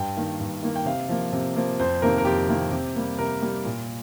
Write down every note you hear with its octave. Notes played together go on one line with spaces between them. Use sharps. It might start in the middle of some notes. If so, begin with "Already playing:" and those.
Already playing: G2 G5
D#3 A#3
G2
D#3 A#3
G5
C3 F5
F3 A#3
C3
F3 A#3
F2 C5
C3 D#3 A#3 A#4
A#4
F2 G4
C3 D#3 A#3
C3
G3 A#3
C3 A#4
G3 A#3
A#2